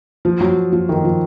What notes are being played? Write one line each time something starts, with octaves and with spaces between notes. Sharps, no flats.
F3
F#3
F3
D#3
F3